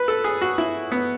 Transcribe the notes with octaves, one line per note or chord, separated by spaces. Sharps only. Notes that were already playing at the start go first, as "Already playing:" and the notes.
Already playing: B4
A4
G#4
F#4
E4
B3